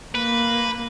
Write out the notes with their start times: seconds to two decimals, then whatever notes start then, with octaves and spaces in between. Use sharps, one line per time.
0.15 A#3 B4